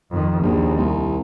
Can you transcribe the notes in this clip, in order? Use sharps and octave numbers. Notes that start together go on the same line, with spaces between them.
F2 D#3
A#1 D#2
C2